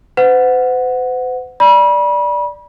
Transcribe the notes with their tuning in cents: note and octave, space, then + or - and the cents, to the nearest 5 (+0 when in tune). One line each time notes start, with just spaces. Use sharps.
C5 -45 F#5 -10
D5 +0 B5 -35